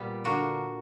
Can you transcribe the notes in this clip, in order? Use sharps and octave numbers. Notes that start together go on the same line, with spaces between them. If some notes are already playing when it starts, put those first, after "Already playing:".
Already playing: A#2 G3 B3
D3 A#3 D4 F#4